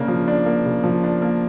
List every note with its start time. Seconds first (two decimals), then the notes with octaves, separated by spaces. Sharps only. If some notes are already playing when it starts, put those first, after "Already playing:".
Already playing: C#3 A#3 D4
0.08 F3
0.28 D4
0.46 A#3
0.66 C#3
0.84 F3
1.04 D4
1.22 A#3